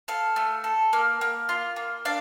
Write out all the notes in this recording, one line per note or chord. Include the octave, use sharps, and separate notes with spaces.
A4 F5
A3
A4
A#3
A#3
F4
A#3
D4 F5